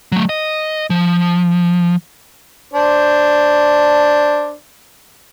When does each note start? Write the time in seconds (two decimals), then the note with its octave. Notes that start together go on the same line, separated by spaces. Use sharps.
0.12 F#3 A3
0.29 D#5
0.90 F3
2.74 D4 C5